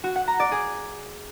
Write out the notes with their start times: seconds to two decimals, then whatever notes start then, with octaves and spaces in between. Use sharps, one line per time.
0.04 F#4
0.16 F#5
0.28 A#5
0.40 D5
0.52 G#4